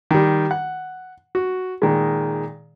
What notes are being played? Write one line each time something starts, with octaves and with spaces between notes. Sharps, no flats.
D#3 G3
F#5
F#4
A#2 D#3 G#3